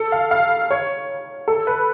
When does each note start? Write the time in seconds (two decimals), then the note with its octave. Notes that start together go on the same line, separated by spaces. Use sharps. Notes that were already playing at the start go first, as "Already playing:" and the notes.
Already playing: A4
0.12 F5
0.31 F5
0.71 C#5
1.48 A4
1.67 B4